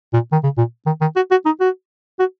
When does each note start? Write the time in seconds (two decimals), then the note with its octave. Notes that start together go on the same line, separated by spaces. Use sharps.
0.13 A#2
0.32 D#3
0.43 C#3
0.58 A#2
0.86 D#3
1.01 D#3
1.16 F#4
1.31 F#4
1.46 D#4
1.60 F#4
2.19 F#4